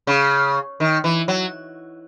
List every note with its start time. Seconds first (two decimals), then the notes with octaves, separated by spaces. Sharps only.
0.07 C#3
0.80 D#3
1.04 E3
1.28 F#3